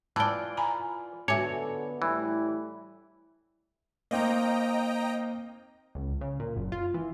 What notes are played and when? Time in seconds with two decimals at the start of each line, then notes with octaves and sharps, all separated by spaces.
0.16 E3 F4 D5 G5 A5
0.57 G#5 A#5 B5
1.28 D3 B3 F#4 A4 C#5 E5 G#5 D6
2.02 A2 E3 G3 E4
4.11 A#3 C4 D#4 D#5 G5 A#5
5.95 C#2
6.21 C#3
6.40 A#2
6.56 F#1
6.72 F4
6.94 E3